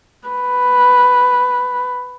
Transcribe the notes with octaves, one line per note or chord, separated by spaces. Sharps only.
B4